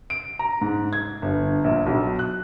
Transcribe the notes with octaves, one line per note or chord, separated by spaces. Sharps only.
D7
A#5
G#2
G#6
G1
A#1
B1
F#6